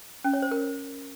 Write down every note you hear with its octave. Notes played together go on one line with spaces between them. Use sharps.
C#4
C#5
C5
A#4